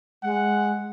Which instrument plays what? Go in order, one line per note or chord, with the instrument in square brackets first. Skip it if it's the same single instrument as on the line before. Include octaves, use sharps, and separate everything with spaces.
[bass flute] G#3 [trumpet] F#5